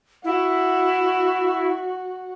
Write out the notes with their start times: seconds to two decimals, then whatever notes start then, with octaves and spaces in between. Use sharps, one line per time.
0.24 E4 F#4